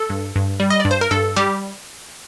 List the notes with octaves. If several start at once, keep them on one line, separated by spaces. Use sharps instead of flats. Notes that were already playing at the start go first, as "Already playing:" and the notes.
Already playing: A4
G2
G2
G3
D#5
D5
G2
C5
A#4
G2 A4
G3 G4